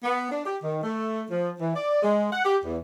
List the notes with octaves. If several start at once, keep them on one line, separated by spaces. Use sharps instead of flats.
B3
D4
G4
D#3
A3
F3
E3
D5
G#3
F#5
G4
E2